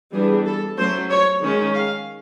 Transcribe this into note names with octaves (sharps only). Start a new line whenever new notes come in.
E3 G3 B3 D4 G#4
A4
F#3 A3 C#4 C5
C#5
D#3 G#3 C#4
F5